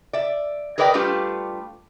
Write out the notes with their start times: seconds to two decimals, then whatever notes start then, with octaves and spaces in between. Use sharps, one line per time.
0.13 D5 E5
0.78 G#4 A#4 B4 D5 D#5 G5
0.94 G3 A3 D4 F4 G4 B4